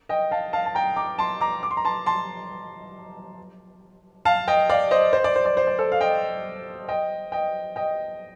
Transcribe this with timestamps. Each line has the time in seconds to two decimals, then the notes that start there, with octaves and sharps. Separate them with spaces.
0.09 D#5 G5
0.31 F5 A5
0.53 F5 A5
0.66 A5
0.75 G5 A#5
0.96 A#5 D6
1.18 A5 C6
1.41 A#5 D6
1.63 D6
1.71 C6
1.77 A#5
1.85 A5 C6
2.06 A5 C6
4.25 F5 A5
4.48 D#5 G5
4.69 D5 F5
4.91 C5 D#5
5.13 C5
5.24 D5
5.36 C5
5.45 D5
5.57 C5
5.67 D5
5.79 A4 C5
5.92 F5
6.01 D#5 G5
6.88 D#5 G5
7.32 D#5 G5
7.76 D#5 G5